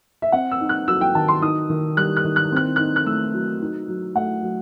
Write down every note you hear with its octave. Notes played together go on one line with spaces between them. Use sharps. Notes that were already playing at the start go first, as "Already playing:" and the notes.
E5
C4 F#5
E6
D#4
F#6
F#3 E6
G5
D#3 A5
C6
D#4 D#6
D#3
G3 F#6
F#6
D#3
F#6
C4 F#6
D#4 F#6
F#6
A3 E6
F#3
D#4
F#3
A3 F#5
F#3